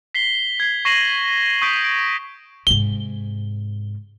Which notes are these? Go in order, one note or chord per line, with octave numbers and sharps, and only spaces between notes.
B6 C7 G7
G#6 C7
C#6 A#6 C7 D#7 E7 F#7
C#6 D#6 G6 B6 D7
D7
G#2 C3 G7